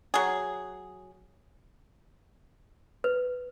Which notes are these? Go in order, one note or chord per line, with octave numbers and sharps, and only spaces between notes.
F#3 G#4
B4